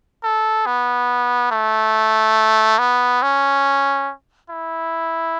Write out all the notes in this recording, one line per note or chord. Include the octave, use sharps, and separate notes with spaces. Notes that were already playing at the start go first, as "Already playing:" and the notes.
A4
B3
A3
B3
C#4
E4